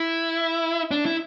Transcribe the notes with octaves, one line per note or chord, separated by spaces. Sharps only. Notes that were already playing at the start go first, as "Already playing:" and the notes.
Already playing: E4
D4
E4